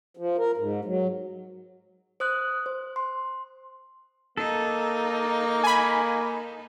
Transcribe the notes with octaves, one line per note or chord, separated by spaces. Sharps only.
F3
A#4
G#2
F#3
C5 D#6 F#6
C5
C6
A#3 D#4 A4
G#5 B5